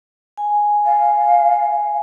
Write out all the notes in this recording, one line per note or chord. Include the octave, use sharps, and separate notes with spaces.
G#5
F5